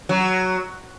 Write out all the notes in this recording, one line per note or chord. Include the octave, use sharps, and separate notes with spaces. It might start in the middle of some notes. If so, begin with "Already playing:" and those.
F#3